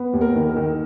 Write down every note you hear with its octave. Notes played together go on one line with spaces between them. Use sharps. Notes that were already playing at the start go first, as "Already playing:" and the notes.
Already playing: B3
D#2
A#4
D#3
A#4
D#3